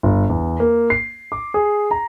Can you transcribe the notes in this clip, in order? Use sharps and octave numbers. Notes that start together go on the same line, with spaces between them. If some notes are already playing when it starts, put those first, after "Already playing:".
G1
E2
A#3
C7
D6
G#4
A#5